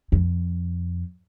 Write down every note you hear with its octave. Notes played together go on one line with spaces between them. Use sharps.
F2